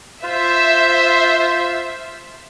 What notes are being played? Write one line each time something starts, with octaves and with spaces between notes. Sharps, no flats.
F4 C5 E5